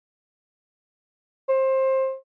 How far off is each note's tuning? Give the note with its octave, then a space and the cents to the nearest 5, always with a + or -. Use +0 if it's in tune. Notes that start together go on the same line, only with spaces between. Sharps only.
C5 +20